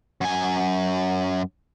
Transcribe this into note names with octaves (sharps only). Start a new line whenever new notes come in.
F#2 G#5